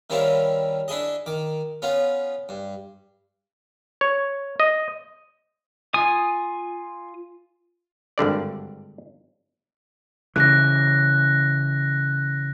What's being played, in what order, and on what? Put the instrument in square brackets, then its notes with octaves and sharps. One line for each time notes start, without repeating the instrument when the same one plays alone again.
[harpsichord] D#3 G3 C4 C#4 E4 F4
D4 E4 G#4 D#5
D#3 D6
B3 C#4 F4
G2
[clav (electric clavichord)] C#5
D#5
[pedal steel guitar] F4 D#6 [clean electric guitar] G#5
[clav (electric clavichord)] G#1 G2 D3 D5
[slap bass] C#3 E3 [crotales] F#6 A#6